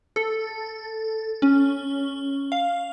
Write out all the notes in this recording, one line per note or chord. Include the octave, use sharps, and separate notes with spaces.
A4
C#4
F5